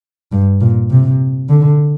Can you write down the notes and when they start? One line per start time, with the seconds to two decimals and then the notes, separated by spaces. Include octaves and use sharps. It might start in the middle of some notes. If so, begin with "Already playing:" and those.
0.32 G2
0.61 A#2
0.91 C3
1.49 D3